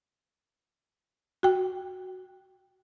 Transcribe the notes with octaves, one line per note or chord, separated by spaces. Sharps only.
F#4 G5